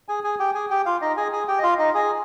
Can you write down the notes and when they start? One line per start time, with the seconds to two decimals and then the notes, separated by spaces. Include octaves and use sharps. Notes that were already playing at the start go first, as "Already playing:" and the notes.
0.08 G#4 G#5
0.24 G#4 G#5
0.39 G4 G5
0.55 G#4 G#5
0.70 G4 G5
0.85 F4 F5
1.02 D#4 D#5
1.17 G#4 G#5
1.33 G#4 G#5
1.48 G4 G5
1.58 D#5
1.63 F4 F5
1.79 D#4 D#5
1.94 G#4 G#5